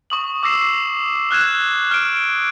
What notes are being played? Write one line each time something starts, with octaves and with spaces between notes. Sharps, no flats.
C#6 D#6 F#7
D6 E6 A#6 C7 E7
C7
F6 F#6 G#6 E7
F6 D7